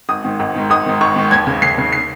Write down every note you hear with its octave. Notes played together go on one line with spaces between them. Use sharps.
G#1 D#6
G#2 D#3
G#1
G#2 D#3
G#1 D#6
G#2 D#3
G#1 C#6
G#2 D#3
D#2 G#6
C#3
D#2 C7
C#3
C7